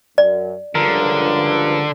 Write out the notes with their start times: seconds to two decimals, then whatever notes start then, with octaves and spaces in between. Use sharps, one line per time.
0.18 F#2 D5
0.75 C#2 G2 D3 F3 A#4